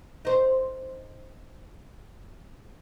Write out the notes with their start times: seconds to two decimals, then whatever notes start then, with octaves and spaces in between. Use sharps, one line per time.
0.25 D#4 C5